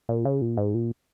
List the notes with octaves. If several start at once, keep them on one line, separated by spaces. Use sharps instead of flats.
A#2
C#3
A#2
G#2
A#2